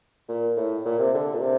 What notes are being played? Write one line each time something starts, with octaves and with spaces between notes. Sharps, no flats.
A#2
A2
A#2
C3
D3
A#2
C3